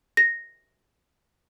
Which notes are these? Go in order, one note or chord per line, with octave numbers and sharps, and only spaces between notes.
A#6